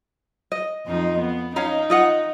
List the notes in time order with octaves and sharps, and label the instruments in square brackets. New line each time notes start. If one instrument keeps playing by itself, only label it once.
[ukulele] D#5
[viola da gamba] F2 F3 D#4
B3
[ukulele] C#4 F5 A#5 [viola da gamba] D#4
[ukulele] F4 D#5 F#5